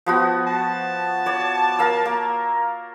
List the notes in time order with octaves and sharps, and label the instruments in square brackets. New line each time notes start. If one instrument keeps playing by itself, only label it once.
[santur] F3 B3 F#4
[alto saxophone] A5
[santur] C#5 D5
A#4 F5 E6
A#3